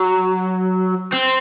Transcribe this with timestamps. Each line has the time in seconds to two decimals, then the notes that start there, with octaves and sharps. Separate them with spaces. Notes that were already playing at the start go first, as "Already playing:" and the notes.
Already playing: F#3
1.12 C4